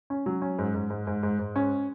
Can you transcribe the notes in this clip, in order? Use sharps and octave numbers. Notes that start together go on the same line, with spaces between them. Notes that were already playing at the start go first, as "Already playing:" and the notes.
C#4
F#3
C#4
G#2
G#2
G#2
G#2
G#2
G#2
C#4